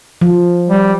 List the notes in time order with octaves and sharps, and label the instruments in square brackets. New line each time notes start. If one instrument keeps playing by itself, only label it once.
[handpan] F3
[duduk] G3